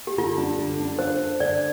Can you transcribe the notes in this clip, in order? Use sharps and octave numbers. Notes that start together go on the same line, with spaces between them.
G4
D3 F4
D4
D3
D4
F4 C5
D4
D3 D5